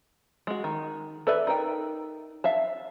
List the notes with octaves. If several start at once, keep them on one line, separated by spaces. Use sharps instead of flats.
G#3 F#4
D#3
A4 B4 D5 E5
D#4 A#4 G5
E5 F5 A5